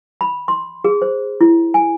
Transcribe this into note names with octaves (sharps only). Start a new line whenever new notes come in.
B5
C6
G#4
C5
E4
G#5